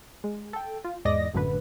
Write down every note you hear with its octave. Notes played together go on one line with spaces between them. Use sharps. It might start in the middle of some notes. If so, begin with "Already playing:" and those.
G#3
A4 G5
F4
E2 G#2 D5 D#5 A#6
G#1 F#2 A2 D3 B4